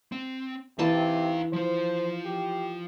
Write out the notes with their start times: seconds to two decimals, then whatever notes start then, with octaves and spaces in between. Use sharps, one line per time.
0.12 C4
0.79 C3 E3 D#4 F5 A5
1.53 F3 F4 C5
2.25 G4